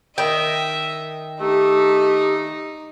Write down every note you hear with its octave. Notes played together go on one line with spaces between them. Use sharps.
D#3 D#5 E5 G5
A3 D#4 G4